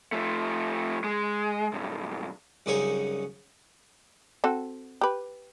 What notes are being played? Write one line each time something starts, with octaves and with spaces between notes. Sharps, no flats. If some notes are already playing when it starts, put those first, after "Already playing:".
F3 A3
G#3
B1 G2
C2 F#2 C#3 D#4 C5 C#5
C4 F#4 A4
G4 B4